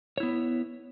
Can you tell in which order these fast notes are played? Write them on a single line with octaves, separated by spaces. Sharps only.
C#5 E4 B3